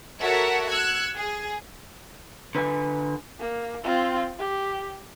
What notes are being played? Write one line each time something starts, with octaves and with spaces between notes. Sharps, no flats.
F#4 A4 A#4 C#5 E5 F#5
E6 F#6 G#6 C#7
G#4
D3 B4 G5 G#5
A#3
C4 F4
G4